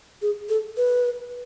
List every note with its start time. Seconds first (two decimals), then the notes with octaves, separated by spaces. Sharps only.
0.22 G#4
0.49 A4
0.77 B4